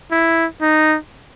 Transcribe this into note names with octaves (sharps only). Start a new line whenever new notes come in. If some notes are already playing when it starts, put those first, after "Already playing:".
E4
D#4